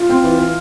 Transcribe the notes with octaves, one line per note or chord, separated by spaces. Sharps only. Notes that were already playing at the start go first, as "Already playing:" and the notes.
Already playing: F4
C4
E3
E3